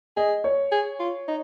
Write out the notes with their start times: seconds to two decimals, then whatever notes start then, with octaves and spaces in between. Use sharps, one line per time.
0.17 G#4 D#5
0.44 C#5
0.72 G#4
0.99 F4
1.28 D#4